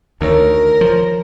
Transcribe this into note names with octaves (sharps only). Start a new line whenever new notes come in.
D2 D#3 A#4 C#5
F3